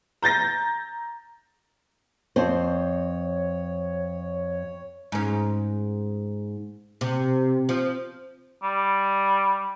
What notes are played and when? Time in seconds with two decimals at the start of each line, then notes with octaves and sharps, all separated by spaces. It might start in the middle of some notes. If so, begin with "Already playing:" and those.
0.22 A#5 G6 A6 A#6
2.36 F2 C4 C5 C#5
5.12 G#2 C#4
7.01 C3
7.69 F3
8.63 G3